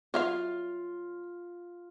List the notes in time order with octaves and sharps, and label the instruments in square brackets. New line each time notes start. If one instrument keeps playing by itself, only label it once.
[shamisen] F#3 E5 F5 [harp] F4